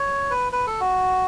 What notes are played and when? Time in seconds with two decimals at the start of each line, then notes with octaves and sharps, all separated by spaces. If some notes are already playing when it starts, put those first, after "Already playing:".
Already playing: C#5
0.30 B4
0.52 B4
0.67 A4
0.80 F#4